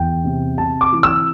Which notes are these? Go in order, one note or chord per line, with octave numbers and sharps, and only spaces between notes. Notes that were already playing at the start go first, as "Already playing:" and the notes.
Already playing: E2 G5
C3
C3 A5
D6
E3
E6